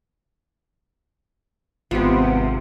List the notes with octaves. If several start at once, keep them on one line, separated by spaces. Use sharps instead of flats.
G#1 C3 B3 F4 G4